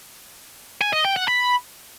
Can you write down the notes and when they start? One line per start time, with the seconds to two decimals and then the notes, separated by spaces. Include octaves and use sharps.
0.81 G#5
0.93 D#5
1.05 G5
1.16 F#5
1.28 B5